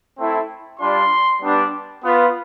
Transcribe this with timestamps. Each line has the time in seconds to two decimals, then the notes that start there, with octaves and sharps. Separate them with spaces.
0.18 A3 C4 E4
0.79 G3 D4 F4 C6
1.41 G3 B3 D4
2.04 B3 F4